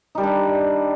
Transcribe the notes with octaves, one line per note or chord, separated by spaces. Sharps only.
D#3 G3 D4 D#4